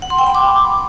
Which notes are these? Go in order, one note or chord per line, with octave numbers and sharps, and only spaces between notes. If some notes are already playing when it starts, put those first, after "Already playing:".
F#5
C6
G5
B5
D6